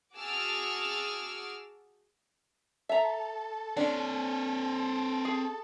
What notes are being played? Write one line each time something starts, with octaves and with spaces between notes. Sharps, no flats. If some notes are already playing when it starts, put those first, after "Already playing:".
F#4 G#4 A5 D6 E6 F6
A4 E5 A#5
C4 D4 C#5
G#4